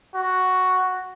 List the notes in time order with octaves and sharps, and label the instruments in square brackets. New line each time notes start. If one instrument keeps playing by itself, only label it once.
[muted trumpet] F#4